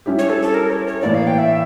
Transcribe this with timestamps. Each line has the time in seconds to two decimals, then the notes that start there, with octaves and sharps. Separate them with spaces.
0.06 G3 C#4 E4 G4
0.19 C#5
0.30 A4
0.42 A4
0.54 A#4
0.70 C#5
0.87 C#5
1.02 A2 E3 A#3 D5
1.14 F5
1.27 G5
1.38 E5